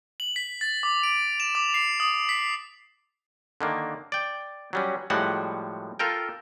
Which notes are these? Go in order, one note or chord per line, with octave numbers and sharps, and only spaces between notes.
F#7
B6
A6
D6
D7
E7
D6
C7
D#6
B6
D3 D#3 A#3
D5 G5
F#3 G3 C#4
A2 F3 G3 G#3 F#4 F#5
F4 A4 A#4 G5